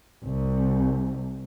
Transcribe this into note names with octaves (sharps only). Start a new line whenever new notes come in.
C2